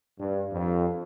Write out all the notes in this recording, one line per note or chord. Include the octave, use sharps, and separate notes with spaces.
G2
F2